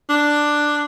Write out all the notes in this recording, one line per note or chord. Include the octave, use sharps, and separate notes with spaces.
D4